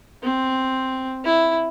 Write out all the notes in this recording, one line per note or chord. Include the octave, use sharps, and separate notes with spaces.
C4
E4